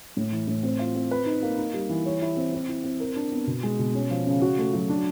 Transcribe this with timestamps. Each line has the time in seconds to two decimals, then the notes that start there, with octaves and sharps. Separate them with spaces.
0.17 A2
0.32 E3
0.48 A2
0.63 C4
0.79 F4
0.95 C4
1.11 B4
1.26 D#4
1.42 A#3
1.58 D#4
1.73 G3
1.89 E3
2.05 C#5
2.22 E4
2.36 C4
2.53 C4
2.68 E4
2.84 C4
3.00 A#4
3.16 D4
3.32 B3
3.47 B2
3.63 G#3
3.79 B2
3.94 C#4
4.10 F3
4.26 C#3
4.42 F#4
4.58 A3
4.74 F#3
4.89 D4